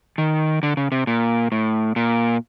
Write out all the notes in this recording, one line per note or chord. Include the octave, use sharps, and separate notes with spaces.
D#3
D3
C#3
C3
A#2
A2
A#2